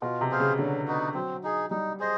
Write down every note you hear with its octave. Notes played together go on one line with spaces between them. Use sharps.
B2 F4
C3
G#4 C5 F5
C#3
D3 F#3
B3 D#4 F#4
F#3 C4
D#4 G#4
G3 D#4
G#4 C5 D#5